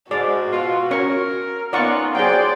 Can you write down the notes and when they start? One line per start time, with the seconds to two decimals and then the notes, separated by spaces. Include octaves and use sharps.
0.11 G#2 F#4 D5
0.51 B2 F4
0.91 C#4 A#4 C#5 C#6
1.73 B3 C#4 D#4 F4 D5 F#5 C#6
2.15 F#3 G#4 C5 D5 F#5 G5